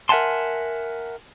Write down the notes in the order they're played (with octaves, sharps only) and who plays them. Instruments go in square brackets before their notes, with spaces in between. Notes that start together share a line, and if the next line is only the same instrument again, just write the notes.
[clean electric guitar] A#4 E5 F#5 G#5 A5 C6